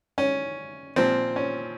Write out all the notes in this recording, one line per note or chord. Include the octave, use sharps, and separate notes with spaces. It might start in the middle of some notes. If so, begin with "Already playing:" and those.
C#4
A#2 F3 C4
C#4